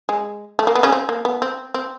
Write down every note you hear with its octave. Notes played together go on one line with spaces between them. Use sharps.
G#3
A3
A#3
B3
C#3 C#4
C4
A#3
B3
C4
C4